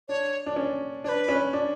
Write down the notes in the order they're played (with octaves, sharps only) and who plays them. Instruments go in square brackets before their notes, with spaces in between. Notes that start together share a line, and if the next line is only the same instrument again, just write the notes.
[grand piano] D4 [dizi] C#5
[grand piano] D4
C#4
[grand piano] D4 [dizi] C#5
[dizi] B4
[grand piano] C#4
D4